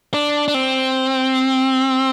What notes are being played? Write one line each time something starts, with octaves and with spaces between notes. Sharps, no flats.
D4
D4
C4